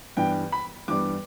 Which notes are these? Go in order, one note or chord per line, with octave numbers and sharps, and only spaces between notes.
G2 E3 G3 B3 G5
B5
G2 E3 G3 B3 D6